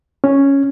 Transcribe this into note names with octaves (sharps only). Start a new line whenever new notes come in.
C#4